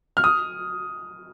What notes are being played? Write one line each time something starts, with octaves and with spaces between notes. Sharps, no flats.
F6
D#6